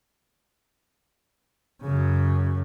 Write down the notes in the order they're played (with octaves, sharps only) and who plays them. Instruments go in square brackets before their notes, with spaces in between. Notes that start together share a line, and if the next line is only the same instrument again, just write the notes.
[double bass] F#2 C#3